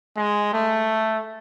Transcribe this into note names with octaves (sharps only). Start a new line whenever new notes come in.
G#3
A3